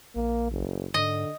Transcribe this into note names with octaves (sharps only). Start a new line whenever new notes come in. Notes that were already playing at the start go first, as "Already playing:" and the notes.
A#1 A#3
F#1
G#2 D3 D#5